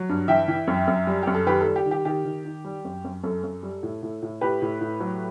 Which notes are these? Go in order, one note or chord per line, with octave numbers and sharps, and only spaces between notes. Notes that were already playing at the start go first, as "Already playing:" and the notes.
Already playing: F#3
G2
E3 E5 G5
E3
F#2
F#2
G3
F#2 G4
A4
D#3 G4 B4
A4
G3
G4
D#3
G4
D#3 G4
D#3
D#3
G3
F#2
F#2
F#2 A4
F#2
G3
A2
A2
A2
A2 G4 B4
A2
A2
F#3